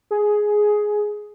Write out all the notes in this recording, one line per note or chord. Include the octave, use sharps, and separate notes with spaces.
G#4